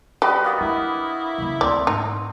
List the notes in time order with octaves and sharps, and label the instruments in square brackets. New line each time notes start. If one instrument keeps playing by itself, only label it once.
[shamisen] G3 [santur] F#4 B4 D#5
[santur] A#3 B3 D#5 [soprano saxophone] F#4
[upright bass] D4 [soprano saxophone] E4
[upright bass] C#3 A#3
[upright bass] D2 [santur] C4 [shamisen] D5
[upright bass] G#2 [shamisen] D#4